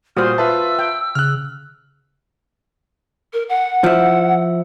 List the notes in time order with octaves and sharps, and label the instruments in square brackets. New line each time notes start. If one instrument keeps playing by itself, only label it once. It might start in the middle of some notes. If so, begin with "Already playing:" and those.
[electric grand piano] A#2 G3 [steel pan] F#4 C5 [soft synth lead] D#6 [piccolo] F6
[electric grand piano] F4 B4 A5 [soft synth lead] E5 [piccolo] E6
[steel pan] G5
[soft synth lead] C#3 [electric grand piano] F6 F#6
[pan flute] A#4
F#5
[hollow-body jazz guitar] F3 E4